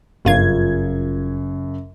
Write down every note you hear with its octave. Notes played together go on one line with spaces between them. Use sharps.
G1 F#2 C#3 F4 G#6